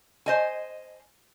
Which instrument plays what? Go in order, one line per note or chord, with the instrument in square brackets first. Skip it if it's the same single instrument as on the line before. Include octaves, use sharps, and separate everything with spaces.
[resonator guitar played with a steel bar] C5 D#5 G#5